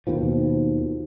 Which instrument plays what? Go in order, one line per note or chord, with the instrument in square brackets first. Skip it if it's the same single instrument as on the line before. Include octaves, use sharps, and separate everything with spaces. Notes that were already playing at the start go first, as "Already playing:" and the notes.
[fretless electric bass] D#2 B2 D#3 F3